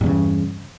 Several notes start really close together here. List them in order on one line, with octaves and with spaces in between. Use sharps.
G2 E2 C#3